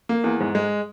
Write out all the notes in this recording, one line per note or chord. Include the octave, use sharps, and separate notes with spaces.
A#3
E2
G#2
G#3